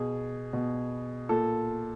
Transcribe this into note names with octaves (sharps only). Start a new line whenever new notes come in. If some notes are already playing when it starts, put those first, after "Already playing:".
Already playing: B2 G#4
B2
A#2 A4